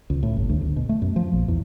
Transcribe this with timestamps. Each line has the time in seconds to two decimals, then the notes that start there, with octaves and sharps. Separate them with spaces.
0.10 C#2
0.23 A2
0.37 G1
0.49 D2
0.61 D2
0.76 B2
0.89 A3
1.02 F#2
1.16 F3
1.33 A#1
1.48 E2